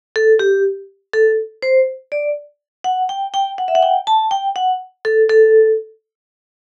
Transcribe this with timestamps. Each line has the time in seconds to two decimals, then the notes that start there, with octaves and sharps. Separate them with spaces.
0.16 A4
0.39 G4
1.14 A4
1.62 C5
2.12 D5
2.84 F#5
3.09 G5
3.34 G5
3.58 F#5
3.68 E5
3.75 F#5
3.83 G5
4.07 A5
4.31 G5
4.56 F#5
5.05 A4
5.29 A4